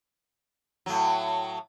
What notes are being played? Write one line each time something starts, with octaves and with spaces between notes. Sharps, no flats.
A2 F#3